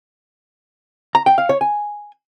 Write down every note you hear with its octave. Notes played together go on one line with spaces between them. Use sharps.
A#5
G5
F5
C#5
G#5